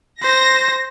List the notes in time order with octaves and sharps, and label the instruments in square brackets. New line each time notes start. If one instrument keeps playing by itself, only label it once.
[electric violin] C5 [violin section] A#6